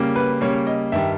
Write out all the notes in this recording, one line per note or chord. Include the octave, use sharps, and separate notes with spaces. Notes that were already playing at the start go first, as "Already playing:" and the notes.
Already playing: C#3 G3 A#3
B4
C#3 G3 A#3 C#5
D#5
G2 D#3 G3 E5